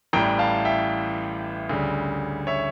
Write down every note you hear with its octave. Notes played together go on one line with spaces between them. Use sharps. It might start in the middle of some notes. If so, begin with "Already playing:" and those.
A1 A2 E3 G3 G5 A#5
F5 A5
E5 G5
D2 C#3 G3
C#5 E5